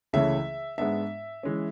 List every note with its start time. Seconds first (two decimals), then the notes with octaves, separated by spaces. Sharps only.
0.13 C#2 C#3 E3 A3 C#4 E5
0.78 G#2 G#3 B3 D4 E5
1.43 E3 G#3 C#4